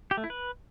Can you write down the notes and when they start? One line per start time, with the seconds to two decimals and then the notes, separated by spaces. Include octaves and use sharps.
0.11 G4
0.17 A3
0.24 E4
0.30 B4